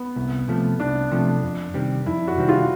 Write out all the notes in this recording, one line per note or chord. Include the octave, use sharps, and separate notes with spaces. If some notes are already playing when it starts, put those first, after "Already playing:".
Already playing: B3
C2
C3 F3 A3
C2 D4
C3 F3 A3
F2
C3 D#3 G3 C4
F2 E4
F#4
C3 D#3 G3 C4
F4